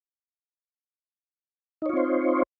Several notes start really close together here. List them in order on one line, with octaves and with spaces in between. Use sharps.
D#4 C#5 F4 C4 C5